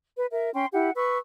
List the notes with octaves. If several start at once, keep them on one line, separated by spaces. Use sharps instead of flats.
B4
A#4 E5
C#4 G5 C6
E4 G4 F#5
B4 C#6 E6